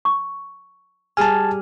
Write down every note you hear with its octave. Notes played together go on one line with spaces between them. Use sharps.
C#6
G3 G#4 G#5 A5 F6